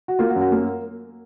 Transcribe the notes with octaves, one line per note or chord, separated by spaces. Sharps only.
F#4
A#3 F4
F#4
F#2
F#4
A#3